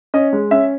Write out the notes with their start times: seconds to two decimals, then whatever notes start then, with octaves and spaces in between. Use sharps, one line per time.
0.14 C#4 D#5
0.33 G#3
0.51 C#4 E5